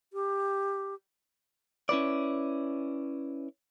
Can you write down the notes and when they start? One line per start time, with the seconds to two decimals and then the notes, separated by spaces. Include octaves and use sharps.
0.13 G4
1.89 C#4 E4 B4 D5